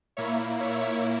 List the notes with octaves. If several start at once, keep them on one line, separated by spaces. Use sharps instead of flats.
A#2 A#3 E4 C#5 E5
C#5 E5